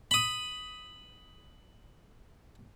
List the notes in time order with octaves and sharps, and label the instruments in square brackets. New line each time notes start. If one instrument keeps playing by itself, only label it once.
[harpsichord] B5 D#6